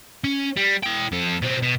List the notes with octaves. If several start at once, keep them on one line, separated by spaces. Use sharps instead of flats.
C#4
G3
E4 G5
F2 A4
B2 C4
B2